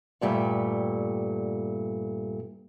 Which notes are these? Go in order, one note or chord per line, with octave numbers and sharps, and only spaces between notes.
G2 A#2 G3 A3